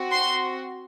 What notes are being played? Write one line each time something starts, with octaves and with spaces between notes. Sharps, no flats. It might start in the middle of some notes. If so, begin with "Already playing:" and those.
Already playing: C4 F#4
C6